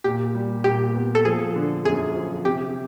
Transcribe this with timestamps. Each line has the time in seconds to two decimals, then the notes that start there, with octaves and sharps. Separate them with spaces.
0.04 A#2 G4
0.35 G3
0.64 A#2 G4
0.94 B3
1.15 A4
1.25 F3 G#4
1.56 D3
1.85 F#2 G#4
2.15 F3
2.45 C3 G4